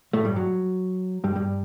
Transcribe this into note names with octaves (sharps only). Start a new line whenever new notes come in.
A2 A3
G2 G3
F#3
G2 G3
G2 G3